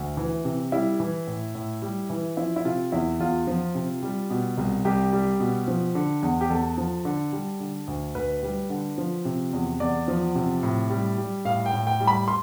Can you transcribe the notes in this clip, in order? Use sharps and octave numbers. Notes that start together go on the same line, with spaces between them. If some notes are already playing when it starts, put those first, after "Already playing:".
Already playing: D2
E3
C3
G3 E4
E3
A2
A2
G3
E3
F3 E4
E4
C3 F4
E2 E4
E2 F4
F3
C3
G3
B2
C2
C2 G4
G3
B2
F3
D3
E2
G4
E2 A4
F3
D3
G3
D3
D2
D2 B4
G3
D3
F3
C3
E2
E2 D5
F3
C3
A2
G3
G3
A2 F5
G5
A2
G5
G3
B5
C6